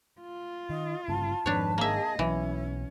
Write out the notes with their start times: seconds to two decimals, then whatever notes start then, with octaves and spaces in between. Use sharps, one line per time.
0.21 F4
0.70 D#3 D#5
1.08 G1 G2 C#3 A5
1.46 F2 G#2 D#3 D4 B4 C#5
1.78 A#3 G#4 D#5 E5
2.19 B1 E3 F#3 C#4 E4